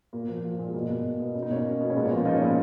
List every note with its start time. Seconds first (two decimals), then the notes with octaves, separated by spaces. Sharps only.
0.13 A#2 A#3
0.28 F3
0.44 F3
0.59 A#2
0.67 G#3
0.74 B2 A#3
0.90 B2
1.04 B2
1.20 B2
1.35 B2 C#4
1.42 D#4
1.50 B2 A#3 C#4
1.65 B2
1.81 B2
1.90 C#4
1.96 A#2 G#3 B3
2.05 A#3 C#4
2.11 F3
2.16 F4
2.25 F3 D#4
2.36 C#4
2.41 A#2 B3 D#4